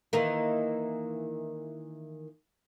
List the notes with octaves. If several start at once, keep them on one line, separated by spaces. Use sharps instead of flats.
D#3 E3 A#3